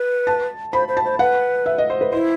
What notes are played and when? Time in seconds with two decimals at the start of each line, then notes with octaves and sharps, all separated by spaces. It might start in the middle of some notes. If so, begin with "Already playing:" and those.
Already playing: B4
0.27 A5
0.73 C5 B5
0.88 C5
0.97 A5
1.05 C5
1.19 B4 F#5
1.66 E5
1.78 D#5
1.90 C5
2.01 B4
2.13 E4 C5